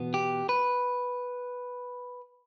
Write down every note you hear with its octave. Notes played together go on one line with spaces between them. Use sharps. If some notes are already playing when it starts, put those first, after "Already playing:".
Already playing: E2 B2 B3
G4
B4